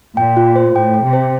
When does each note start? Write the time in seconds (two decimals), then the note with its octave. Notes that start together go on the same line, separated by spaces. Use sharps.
0.17 A#2 G5
0.37 F4
0.56 C5
0.75 A2 G5
0.94 G5
1.04 C3
1.13 C5